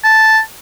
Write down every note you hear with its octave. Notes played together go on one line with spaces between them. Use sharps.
A5